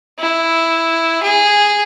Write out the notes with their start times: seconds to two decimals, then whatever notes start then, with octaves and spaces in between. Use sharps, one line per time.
0.19 E4
1.23 G#4